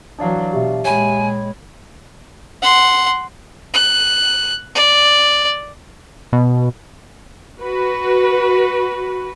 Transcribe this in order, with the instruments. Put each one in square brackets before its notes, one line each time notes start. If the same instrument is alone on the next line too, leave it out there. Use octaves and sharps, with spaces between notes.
[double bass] E3 F#3 [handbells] D4 D5 F5
[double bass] B2 [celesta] G4 E5
[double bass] A#2 G#3 [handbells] C#5 G5 B5 [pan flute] G#5
[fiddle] F#5 C6
F#6
D5
[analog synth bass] B2
[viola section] F#4 B4